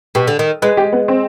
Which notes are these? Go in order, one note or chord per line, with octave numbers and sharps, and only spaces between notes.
B2 G4
D3
D#3
G#3 B4
G4
B3
C4